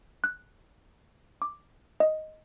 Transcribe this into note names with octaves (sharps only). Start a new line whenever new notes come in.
F#6
D6
D#5